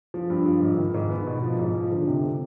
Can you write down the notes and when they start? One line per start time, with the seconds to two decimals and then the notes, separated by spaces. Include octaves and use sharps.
0.14 F3
0.30 G2
0.46 F3
0.61 G#2
0.78 D#3
0.94 G#2
1.10 B3
1.27 B2
1.43 F3
1.59 G#2
1.74 F3
1.91 D3
2.07 C3